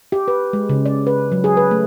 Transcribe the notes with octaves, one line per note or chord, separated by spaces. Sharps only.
G4
B4
G#3
C#3
D5
B4
F#3
G#4
B4
A3